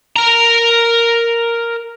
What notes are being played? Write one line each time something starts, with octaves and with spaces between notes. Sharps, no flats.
A#4 A#5